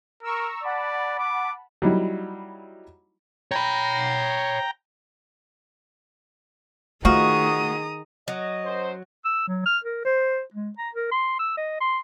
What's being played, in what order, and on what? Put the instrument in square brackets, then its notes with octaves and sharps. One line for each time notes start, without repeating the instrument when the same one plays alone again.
[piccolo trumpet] A#4 [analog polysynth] A#5 C#6 E6
[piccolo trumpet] D5 [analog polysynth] F#5 A5 B5
[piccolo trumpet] D6
[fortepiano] F#3 G3 D#4 E4
[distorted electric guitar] C#5 B5 [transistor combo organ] G5 A#5
[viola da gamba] D#3 G#4 D#5 [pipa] F3 F#4 [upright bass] A3 [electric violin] A#5 D#6
[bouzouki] F#3 [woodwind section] D#5
[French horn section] F#2 C5
[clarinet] E6
F#3
F6
A#4
C5
G#3
A#5
A#4
C6
E6
D#5
C6